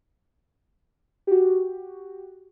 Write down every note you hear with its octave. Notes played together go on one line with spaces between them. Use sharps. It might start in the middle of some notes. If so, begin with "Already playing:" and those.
F#4 G4